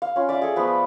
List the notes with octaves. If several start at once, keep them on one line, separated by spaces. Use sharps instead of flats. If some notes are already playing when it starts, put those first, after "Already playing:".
F5
C#4 F4
D5 E5 F5
G#4 A4
F3 A3 B3 B5